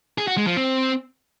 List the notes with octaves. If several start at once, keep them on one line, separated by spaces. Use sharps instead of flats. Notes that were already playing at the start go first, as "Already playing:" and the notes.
G#4
F#4
G#3
F3
C4